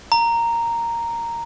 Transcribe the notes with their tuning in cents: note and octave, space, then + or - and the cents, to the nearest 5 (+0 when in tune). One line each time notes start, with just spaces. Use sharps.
A#5 -5